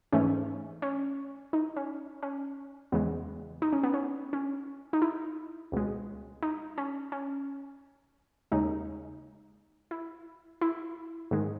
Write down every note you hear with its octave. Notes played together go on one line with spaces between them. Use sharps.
G#2 E3 A3 C#4
C#4
D#4
C#4
C#4
E2 C#3 E3 G#3 B3
D#4
C#4
B3
C#4
C#4
D#4
E4
C#2 B2 G#3
D#4
C#4
C#4
D#2 C#3 G#3 D#4
E4
E4
G#2 D#3 G#3